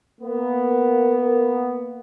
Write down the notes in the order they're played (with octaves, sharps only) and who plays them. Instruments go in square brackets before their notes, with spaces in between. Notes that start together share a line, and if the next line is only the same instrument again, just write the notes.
[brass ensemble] A#3 B3